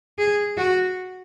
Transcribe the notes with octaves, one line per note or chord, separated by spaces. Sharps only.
G#4
F#4